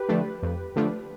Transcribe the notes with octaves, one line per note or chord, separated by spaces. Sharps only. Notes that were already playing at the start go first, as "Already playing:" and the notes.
Already playing: G4 B4
D3 F3 A3 D4
F2
D3 F3 A3 D4